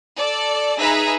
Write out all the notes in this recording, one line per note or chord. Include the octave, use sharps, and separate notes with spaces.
A4 D5
D#4 G#4 B4 E5 A#5